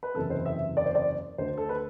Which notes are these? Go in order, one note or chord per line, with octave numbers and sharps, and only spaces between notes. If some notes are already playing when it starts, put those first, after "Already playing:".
B4
F#1 E2 C3 A4
C5
E5
D5
C5
D5
D2 D3 C5
A4
B4